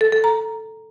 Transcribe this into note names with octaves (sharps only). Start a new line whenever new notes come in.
A4
A4
A#5